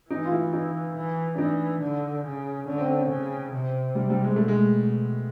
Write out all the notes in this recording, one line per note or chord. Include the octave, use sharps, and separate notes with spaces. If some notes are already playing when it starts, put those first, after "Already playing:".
E3 D#4
F4
E4
D#4
E3
D4
E3 D#4
D3
C#3
D3 C#4
C4
C#4
C#4
C#3
C3
G3
G3
G#3
B2 A3
G#3